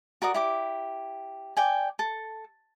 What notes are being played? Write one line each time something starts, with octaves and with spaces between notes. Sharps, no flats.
F#4 A#4 D5 D#6
E4 G4 D6
D5 G5 G#5
A4